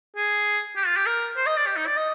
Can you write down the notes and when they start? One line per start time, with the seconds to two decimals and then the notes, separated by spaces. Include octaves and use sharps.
0.16 G#4
0.77 G4
0.86 F4
0.97 G4
1.06 A#4
1.37 C5
1.46 D#5
1.57 D5
1.66 G4
1.76 D#4
1.87 D5
1.97 D#5